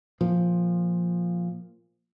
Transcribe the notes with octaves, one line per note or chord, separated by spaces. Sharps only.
A#2 F3